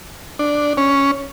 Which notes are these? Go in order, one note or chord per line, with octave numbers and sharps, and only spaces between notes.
D4
C#4